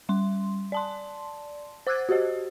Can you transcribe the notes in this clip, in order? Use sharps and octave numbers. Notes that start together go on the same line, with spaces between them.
G3 C6
D5 A5 C6
C5 D6 E6 F#6 G#6 A6
F#4 G4 C5 D#5